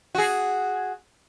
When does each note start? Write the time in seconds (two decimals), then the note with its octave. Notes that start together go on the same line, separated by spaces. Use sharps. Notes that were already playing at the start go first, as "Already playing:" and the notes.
0.15 F#4 G#4